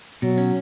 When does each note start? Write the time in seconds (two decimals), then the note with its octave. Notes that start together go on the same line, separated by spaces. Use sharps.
0.22 B2 F#3
0.38 C#4